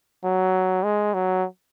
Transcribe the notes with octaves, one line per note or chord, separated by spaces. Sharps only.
F#3
G#3
F#3